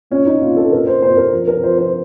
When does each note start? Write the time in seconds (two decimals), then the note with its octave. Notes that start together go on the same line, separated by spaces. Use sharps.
0.11 A#2 C#4
0.26 D#4
0.41 A#2 F4
0.56 A4
0.72 A#2 A#4
0.87 C5
1.02 A#2 C5
1.17 A#4
1.32 F3
1.48 A#4
1.63 F3 C5
1.78 C5